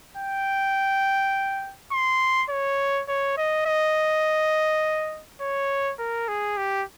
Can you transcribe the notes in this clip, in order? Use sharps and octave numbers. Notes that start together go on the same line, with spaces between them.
G5
C6
C#5
C#5
D#5
D#5
C#5
A#4
G#4
G4